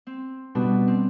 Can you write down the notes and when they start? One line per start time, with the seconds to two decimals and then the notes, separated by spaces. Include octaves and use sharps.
0.07 C4
0.55 B2 G3 D4 B4
0.88 C4